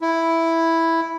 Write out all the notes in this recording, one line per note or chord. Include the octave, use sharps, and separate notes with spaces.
E4